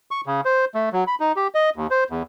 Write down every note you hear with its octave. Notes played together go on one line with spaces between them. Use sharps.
C#6
C#3
C5
A3
F#3
B5
D#4
G4
D#5
D#2
C5
E2